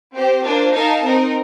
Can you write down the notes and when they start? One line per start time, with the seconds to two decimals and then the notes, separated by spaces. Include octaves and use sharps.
0.15 C4 G4 C5
0.45 A#3 D4 F4 C5
0.75 D#4 A#4 F5 A5
1.04 C4 D#4 A#4